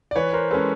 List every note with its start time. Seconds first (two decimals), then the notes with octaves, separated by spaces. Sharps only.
0.11 D5
0.16 E3 B4 C#5
0.33 A#4 C5
0.51 G#3 C#4 A4 B4